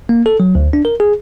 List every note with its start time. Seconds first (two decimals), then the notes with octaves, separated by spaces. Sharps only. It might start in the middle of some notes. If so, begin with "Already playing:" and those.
0.09 A#3
0.26 A4
0.40 F#3
0.55 D2
0.73 D4
0.85 A#4
1.00 G#4